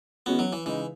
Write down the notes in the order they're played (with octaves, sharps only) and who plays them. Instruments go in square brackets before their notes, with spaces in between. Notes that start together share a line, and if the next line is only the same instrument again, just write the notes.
[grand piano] E3 G#3 C#4 F#4 [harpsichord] B3
[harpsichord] F#3
E3
[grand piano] C#3 G#3 D#4 [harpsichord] E3